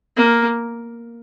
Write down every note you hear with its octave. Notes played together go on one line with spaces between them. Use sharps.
A#3